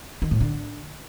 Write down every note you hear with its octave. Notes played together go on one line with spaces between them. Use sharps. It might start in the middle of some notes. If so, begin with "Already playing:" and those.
D#3
A2
D3